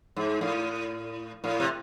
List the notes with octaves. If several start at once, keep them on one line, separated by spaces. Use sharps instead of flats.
G#2
A2
A2
C3